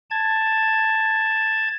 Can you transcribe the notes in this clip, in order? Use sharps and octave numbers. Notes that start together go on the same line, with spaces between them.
A5 G#6